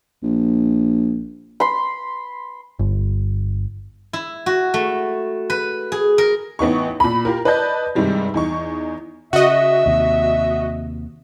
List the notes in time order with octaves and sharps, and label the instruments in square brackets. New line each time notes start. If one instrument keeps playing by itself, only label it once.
[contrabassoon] A#1
[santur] B5 C6
[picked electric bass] G1
[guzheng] E4
F#4
A3
B4
G#4
A#4
[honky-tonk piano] A1 B3 D#4 C#6
A#2 B5
F4 G4 A#4
B4 D5 D#5 A5 G6
G2 C3 D#3 G3 G#3
E2 D#4 C#6
[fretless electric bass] C#3 [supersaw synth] F#4 D#5 [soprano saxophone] E5
[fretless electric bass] D#2 C3